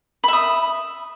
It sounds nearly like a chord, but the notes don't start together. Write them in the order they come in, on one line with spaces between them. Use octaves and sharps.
B5 E5 D#6